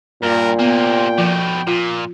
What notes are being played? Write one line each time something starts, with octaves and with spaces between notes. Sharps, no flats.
G2 A#2 A#4
C3 A#3 B3 G5
B2 F3 A3
A#2 F4